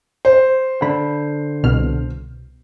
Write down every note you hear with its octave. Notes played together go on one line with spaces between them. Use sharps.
C5
D3 B5
C2 B2 F6